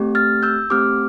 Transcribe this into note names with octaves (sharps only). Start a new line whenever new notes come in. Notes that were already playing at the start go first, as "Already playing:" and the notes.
Already playing: A3 C4 G4
F6 A6
E6 G6
A3 C4 G4 D6 F6